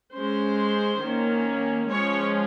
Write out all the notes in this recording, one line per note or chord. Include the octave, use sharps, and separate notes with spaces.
G#3 C#4 C5
D#3 A#3 C#4
F3 G#3 C#4 C#5